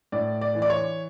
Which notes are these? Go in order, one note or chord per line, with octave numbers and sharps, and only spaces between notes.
A2 D5
D5
E3
D5
C#5